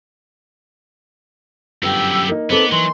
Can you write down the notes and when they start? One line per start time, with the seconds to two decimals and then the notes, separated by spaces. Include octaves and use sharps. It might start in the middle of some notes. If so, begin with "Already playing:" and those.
1.83 G1 F#2 B3 G4 G5 E6
2.29 A#3 D#4
2.50 B3 C4 A4 B4 D6
2.72 E3 F#3 C6